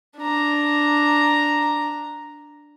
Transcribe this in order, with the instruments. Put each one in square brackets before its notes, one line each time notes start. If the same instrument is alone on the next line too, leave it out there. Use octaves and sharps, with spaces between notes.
[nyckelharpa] D4 A#5